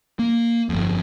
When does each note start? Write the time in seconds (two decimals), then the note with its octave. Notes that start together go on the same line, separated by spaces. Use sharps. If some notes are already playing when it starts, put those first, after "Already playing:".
0.19 A#3
0.69 G1 F2